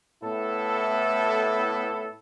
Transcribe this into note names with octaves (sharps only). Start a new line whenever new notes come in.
A2 B3 E4 A4